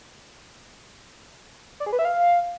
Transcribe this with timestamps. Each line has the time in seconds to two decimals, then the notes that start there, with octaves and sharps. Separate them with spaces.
1.80 D5
1.86 G#4
1.93 B4
1.99 E5
2.05 F5